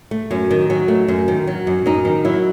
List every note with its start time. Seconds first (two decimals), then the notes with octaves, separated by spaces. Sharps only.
0.11 A3
0.31 F#2 C#4
0.51 D#3
0.70 F#3 C#4
0.88 A3
1.08 F#2
1.28 D#3
1.47 F#3
1.67 F#2
1.86 F#2 D#4
2.05 D#3
2.25 F#3 E4